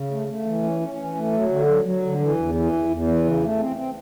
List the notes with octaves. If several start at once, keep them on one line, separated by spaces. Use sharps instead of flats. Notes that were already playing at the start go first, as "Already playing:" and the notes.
Already playing: C#3
A3
A3
E3
C#4
C#4
E3
A3
F#3
D3
F#3
F#3
D3
E3
E2
E3
E2
E2
E3
C#3
A3
C4
C4